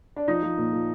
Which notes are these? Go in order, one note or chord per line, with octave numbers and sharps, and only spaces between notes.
D4
F3 D#4
F3
A#2
F3